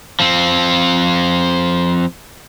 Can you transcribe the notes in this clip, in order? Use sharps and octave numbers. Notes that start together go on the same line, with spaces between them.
F3 C4